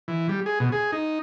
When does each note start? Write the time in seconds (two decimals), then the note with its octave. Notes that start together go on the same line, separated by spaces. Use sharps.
0.08 E3
0.29 G3
0.46 G#4
0.60 B2
0.72 G#4
0.92 D#4